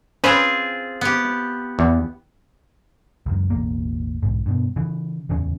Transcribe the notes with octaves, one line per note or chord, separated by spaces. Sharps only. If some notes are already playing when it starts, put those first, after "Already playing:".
C4 C#4 F4 G#4 B4 C5
B3 G4
E2
C#2 F#2
E1 A1 A#3
B1 G#2
G2 B2
C#3 E3
D1 E2 C#3 C#4